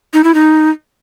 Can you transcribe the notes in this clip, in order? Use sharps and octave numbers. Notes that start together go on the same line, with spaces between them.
D#4
E4
D#4